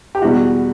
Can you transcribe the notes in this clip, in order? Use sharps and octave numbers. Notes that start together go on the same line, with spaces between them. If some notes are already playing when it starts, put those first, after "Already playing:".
G4
E2 B2 G3 F#4